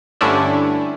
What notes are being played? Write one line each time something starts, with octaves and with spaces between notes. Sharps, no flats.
G2 D3 A3 C#4 D4 E4